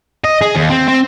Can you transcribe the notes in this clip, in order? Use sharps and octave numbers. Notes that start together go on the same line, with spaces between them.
D#5
G#4
D#2
C4
C4